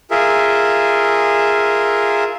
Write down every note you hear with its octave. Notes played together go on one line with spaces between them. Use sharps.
F4 G#4 A#4 E5